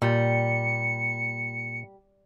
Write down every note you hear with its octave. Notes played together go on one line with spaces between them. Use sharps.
A#2 G3 C#7